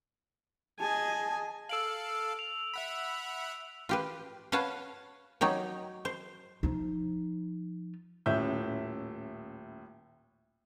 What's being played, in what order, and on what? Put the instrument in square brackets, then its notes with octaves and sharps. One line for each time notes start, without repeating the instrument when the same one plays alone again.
[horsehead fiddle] G#4 D#5 [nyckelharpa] G#5 [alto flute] A5
[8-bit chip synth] A4 F5 [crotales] E6 D7 F#7
[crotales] F7
[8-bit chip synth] E5 F#5 B5
[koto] F4 G4 B4
B4 C#5 F5 F#5 A5
F#3 D#4 G4 C#5
C5
[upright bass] F3 D#4
[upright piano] D#1 A2 C#4 E5 G6